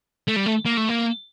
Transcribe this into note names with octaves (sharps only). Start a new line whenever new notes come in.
A3
G3
A3
A#3
A3
A#3